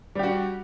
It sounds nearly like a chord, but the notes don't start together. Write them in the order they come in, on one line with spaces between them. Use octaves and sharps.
G3 G4 F#4